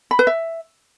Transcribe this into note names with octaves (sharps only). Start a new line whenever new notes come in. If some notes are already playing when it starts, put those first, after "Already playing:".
B5
B4
E5